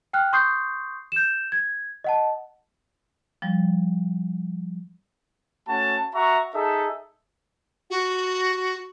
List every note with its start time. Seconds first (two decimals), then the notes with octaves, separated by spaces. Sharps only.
0.13 G5 F6 F#6
0.33 C6 C#6 D#6 G6 C7
1.12 G6 E7
1.52 G#6
2.04 D#5 F#5 A5
3.42 F3 G3
5.68 A3 C#4 F#4 A5
6.15 F#4 E5 A#5 C#6
6.55 D#4 G#4 A4 E5
7.90 F#4